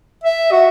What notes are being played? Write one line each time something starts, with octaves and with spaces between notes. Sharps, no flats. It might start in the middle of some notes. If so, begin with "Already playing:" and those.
E5
F#4